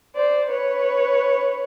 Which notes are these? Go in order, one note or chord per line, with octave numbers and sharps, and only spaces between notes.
C5 D5
B4 C#5